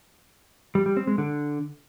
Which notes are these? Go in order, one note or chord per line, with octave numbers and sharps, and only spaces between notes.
G3
G3
C4
G#3
D3